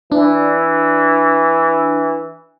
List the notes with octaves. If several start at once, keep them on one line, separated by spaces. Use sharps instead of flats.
E3 D4